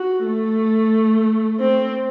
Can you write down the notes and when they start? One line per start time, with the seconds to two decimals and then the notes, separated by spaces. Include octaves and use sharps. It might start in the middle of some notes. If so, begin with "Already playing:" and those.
Already playing: F#4
0.26 A3
1.60 C4